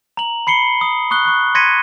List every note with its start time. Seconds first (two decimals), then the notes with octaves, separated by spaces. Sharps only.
0.17 A#5 F#7
0.47 B5 C7 C#7 G7
0.81 D#6
1.11 C#6 D#6 F#6 G7
1.25 C#6 F#6
1.55 C6 G#6 A#6 B6 C#7 D#7